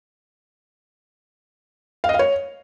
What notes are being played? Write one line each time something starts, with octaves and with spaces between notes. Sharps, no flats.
F5
D#5
F5
C#5